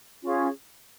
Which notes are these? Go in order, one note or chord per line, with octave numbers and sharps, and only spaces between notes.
C#4 F4 G#4